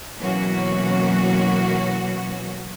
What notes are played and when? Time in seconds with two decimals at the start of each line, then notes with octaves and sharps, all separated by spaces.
0.19 B2 E3 F#3 A#3 C#4 F#4